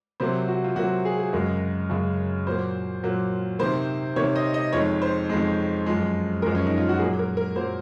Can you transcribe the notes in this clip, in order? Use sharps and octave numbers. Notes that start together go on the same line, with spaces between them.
C3 F#3 A#3 C5
F#4
F4
C3 F#3 A#3 F#4
G#4
G#4
F#2 C#3 G#3 A#4
F#2 C#3 G#3
A#2 F#3 A#3 C5
A#2 F#3 A#3
C3 D#3 A#3 C5
C3 D#3 A#3 C#5
D#5
D#5
F2 D#3 G#3 C#5
C5
F2 D#3 G#3
F#2 F3 G#3
F#2 F3 G#3 A#4
C#4
D#4
F4
F#4
A#2 F#3 A#3 G#4
A#4
A#4
A#2 F#3 A#3 C5